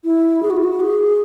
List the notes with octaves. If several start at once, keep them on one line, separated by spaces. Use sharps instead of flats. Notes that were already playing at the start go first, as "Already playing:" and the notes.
E4
G#4
F#4
E4
F#4
G#4